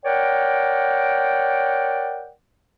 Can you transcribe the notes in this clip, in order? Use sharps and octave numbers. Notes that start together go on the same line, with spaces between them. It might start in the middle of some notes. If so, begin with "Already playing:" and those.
A#4 C#5 D5 F#5 G5